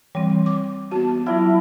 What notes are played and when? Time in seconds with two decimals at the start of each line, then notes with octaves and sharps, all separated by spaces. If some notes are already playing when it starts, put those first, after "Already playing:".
0.15 E3 G3 C4
0.46 D6
0.91 B3 F#4 A5
1.26 F#3 E4 F4 D5 A#5